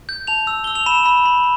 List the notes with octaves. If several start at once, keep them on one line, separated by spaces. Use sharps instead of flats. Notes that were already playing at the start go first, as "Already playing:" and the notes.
G6
A5 F7
E6
E6 G7
F7
B5 E7
B5
B5